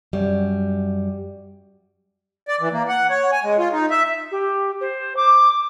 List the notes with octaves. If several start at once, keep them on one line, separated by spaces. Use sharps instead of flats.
F#2 G3
D5
E3
A#3
F#5
C#5
G#5
G#3
F4
D#4
E5
G4
C5
D6